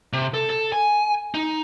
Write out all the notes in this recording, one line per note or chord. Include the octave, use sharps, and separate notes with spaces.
C3
A4
A4
G#5
D#4